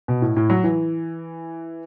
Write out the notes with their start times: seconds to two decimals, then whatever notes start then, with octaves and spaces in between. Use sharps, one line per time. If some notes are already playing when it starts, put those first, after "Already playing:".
0.08 B2
0.22 A2
0.37 A2
0.50 F#3
0.64 E3